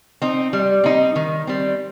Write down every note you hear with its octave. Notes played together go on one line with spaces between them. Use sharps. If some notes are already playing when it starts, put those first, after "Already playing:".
C4 D#4
G3
C4 D#4
D#3
G3 C4